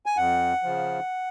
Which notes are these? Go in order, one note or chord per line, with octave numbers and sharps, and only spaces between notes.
G#5
F2 F#5
C#3 F3